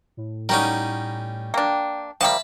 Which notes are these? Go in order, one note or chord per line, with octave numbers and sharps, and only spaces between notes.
A2
G3 C#4 D#4 F#4 A#4
A#3 D4 G5
F3 G3 A#3 E5 A5 B5